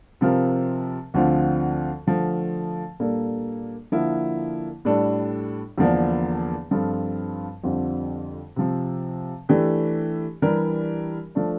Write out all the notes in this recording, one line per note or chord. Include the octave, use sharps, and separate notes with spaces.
C3 F3 C4 F4 A#4
D2 D3 F3 C4 F4
D3 F3 A3
A#2 G3 A#3 D4 A4
D3 F3 A#3 E4
A2 G3 D4 A4
E2 D3 F3 A#3 D4
G2 F3 C4 F4 A4
F2 D3 G3 C4 F4
C3 F3 C4
E3 A3 D4 G4
E3 G3 D4 G4 A#4
F3 A3 D4